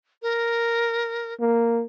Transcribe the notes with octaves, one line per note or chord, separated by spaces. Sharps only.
A#4
A#3